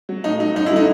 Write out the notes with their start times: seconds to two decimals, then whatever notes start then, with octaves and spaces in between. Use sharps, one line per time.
0.09 F#3
0.24 A2 D#4
0.40 F#3 D#4
0.56 F#2 D#4
0.66 E4
0.71 D3 F#3 D#4